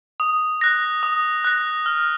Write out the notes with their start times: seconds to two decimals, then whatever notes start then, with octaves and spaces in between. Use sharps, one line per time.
0.20 D#6
0.61 F#6 A#6
1.03 D#6
1.44 F#6 A#6
1.86 F6